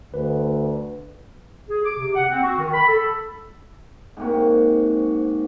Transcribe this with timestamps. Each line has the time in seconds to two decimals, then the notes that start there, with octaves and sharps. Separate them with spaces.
0.14 D2 B4
1.69 G#4
1.84 D6
1.97 C3
2.15 F#5
2.30 C4
2.42 F#4
2.57 D#3
2.73 B5
2.88 A4
4.17 G#2 C3 A#3 F#4